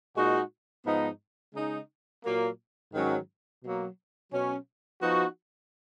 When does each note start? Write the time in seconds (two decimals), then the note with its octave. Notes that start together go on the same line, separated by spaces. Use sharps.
0.16 A#2 G#3 D#4 F#4
0.85 G#2 F3 B3 D#4
1.54 C#3 G#3 D#4
2.24 A#2 F#3 A#3
2.93 G#2 D#3 F#3 C#4
3.62 B2 F#3 A#3
4.32 B2 F#3 C#4
5.01 F3 B3 D#4 F#4